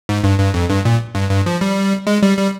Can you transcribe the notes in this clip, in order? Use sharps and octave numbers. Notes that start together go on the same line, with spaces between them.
G#2
G2
G2
F2
G2
A#2
G2
G2
F3
G3
G#3
G3
G3